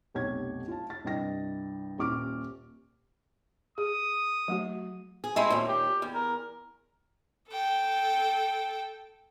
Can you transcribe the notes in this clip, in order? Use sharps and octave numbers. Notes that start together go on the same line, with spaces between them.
F1 B1 G4 C#5 C#6 G#6
F4 A5
A6
C2 G2 D#5 G5 A#6
D#1 A#2 C#6 D6 F6 D7
G#4 D#6
F#3 A3 F#4
G#4
G#3 A3 C4 E4
D#2 A#2
G4
E2
A#4
A4 G5